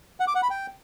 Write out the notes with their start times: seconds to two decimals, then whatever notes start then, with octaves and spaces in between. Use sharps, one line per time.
0.20 F#5
0.27 D6
0.35 F#5
0.43 B5
0.50 G5